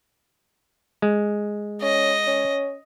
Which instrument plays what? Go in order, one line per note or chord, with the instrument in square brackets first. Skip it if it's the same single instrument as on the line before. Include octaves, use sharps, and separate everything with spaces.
[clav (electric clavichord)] G#3
[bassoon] C#4 [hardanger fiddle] D#5
[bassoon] C#4